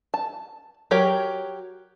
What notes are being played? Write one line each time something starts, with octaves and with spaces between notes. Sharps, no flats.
A5
F#3 G4 A#4 C#5 G5